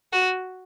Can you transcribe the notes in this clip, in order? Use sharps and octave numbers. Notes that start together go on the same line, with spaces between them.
F#4